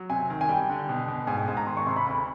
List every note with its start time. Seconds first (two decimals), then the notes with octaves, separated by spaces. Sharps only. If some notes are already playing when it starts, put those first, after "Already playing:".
Already playing: F#3
0.10 C3 G#5
0.30 D#3
0.41 G#5
0.49 G3 G5
0.69 D3
0.89 B2
1.08 B2
1.27 G#2 G#5
1.37 G5
1.47 G#2 G#5
1.57 A#5
1.67 D#3 C6
1.77 C#6
1.86 C3 C6
1.96 B5
2.07 D2 B5